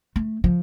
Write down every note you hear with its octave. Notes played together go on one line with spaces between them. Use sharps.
A3
F3